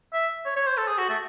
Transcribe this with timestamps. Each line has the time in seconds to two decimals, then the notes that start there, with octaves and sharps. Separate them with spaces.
0.13 E5
0.45 C#5
0.56 C#5
0.67 C5
0.77 A4
0.88 G#4
0.98 F#4
1.09 A3